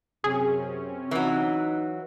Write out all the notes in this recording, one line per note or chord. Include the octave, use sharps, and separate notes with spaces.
F#2 C3 C4 C#4 G#4
E3 F#3 D#4